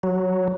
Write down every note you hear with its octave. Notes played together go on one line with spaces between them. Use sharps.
F#3